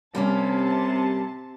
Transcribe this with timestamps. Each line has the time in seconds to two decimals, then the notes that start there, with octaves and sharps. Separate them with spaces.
0.15 C3 G3 A#3 C#4 A5